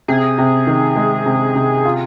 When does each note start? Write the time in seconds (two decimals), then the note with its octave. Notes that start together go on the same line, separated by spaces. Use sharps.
0.08 C3 G#4
0.38 C3
0.67 D#3
0.96 G#3
1.26 C3
1.56 C3
1.85 F4